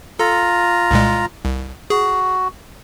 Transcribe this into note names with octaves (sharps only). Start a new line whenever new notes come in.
F4 A4 A#5
C2 A#2 G#3
C2
F#4 G#4